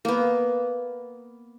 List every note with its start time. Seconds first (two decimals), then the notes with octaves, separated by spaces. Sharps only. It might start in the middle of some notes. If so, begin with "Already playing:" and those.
0.05 A#3 B3